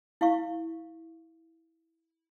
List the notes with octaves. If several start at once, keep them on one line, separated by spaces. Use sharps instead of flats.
E4 F5 C#6